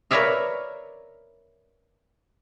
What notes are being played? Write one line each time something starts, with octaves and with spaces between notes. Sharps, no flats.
A#4 B4 C#5 D5 E5 F5